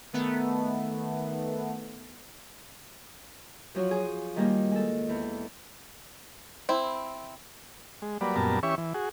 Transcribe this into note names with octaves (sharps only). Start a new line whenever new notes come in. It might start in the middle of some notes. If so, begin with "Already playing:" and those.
D#3 A3 B3
F3 F#3 F4 F#4
G#4
D#3 G3 A#3
G#3 A4
E2
C4 E4
G#3
F#3 G3 A#3 B4 D5
F#2 A#2 G3 B3 A#4 A5
E3 C#4 G4 C#5 E5 C#6
E3
F#4 G#4